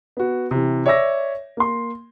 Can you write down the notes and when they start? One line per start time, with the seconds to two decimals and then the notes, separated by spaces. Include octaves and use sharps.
0.17 B3 F#4
0.51 C3 E3
0.86 C#5 D5 E5 D6 E6 A#6
1.57 A#3 C6